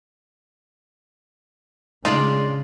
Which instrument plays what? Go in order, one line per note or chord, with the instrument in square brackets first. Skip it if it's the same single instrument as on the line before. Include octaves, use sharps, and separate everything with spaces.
[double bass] C#3 [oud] G#3 D4 D5 [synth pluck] A3 D#4 [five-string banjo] F4